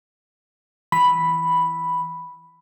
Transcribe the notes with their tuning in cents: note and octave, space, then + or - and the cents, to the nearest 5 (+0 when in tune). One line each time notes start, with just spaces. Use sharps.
E3 -5 B5 +0